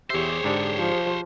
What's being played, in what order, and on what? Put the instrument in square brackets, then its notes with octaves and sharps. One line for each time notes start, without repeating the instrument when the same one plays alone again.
[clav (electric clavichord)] E2 E5 [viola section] G4 G#4 [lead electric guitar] C5 C#5
[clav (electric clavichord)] G#2 D3 D4
[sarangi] F3